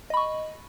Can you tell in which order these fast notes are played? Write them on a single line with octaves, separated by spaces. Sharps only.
D#5 B5 C#6